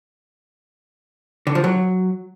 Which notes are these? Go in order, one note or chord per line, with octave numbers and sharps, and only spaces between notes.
D3
F3
F#3